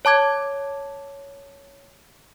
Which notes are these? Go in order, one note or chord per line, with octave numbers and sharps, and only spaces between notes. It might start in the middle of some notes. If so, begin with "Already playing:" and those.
C#5 A5 D6 G#6